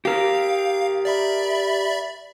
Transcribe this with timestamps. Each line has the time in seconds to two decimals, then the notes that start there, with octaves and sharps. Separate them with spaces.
0.05 G4 A#4 F5
1.05 D5 E5 B5